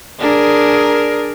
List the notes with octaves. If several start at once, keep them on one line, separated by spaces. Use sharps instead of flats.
D4 G#4 A#4